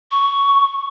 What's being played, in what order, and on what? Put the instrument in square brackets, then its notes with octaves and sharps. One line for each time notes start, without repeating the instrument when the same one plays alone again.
[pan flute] C#6